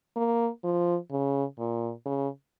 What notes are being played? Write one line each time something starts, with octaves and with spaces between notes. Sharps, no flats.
A#3
F3
C#3
A#2
C#3